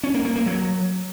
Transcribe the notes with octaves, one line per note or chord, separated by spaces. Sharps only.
C#4
A#3
A#3
A#3
F#3